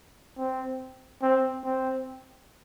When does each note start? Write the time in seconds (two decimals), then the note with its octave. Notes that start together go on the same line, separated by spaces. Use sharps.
0.38 C4
1.22 C4
1.64 C4